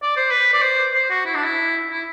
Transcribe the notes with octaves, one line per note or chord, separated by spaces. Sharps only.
D5
C5
B4
D5
C5
C5
F#4
E4
D4
E4
E4